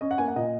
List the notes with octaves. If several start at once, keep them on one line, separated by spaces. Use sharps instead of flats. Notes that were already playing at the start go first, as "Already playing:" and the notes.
C#4 D#5
F#5
A#3 G#5
F#5
A#2 D#5